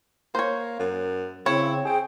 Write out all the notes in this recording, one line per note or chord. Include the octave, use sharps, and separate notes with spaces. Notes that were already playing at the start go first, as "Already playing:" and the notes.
A#3 C5 C#5
F#2
C#3 C4 E4 C#5
C4 G#4 G5